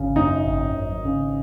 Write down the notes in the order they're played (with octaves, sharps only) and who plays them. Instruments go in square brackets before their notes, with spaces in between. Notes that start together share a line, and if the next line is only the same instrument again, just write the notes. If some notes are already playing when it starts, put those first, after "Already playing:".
Already playing: [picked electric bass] G#1 C#3
[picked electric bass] F#2 [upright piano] D#4
[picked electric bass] G#1
G#1
C#3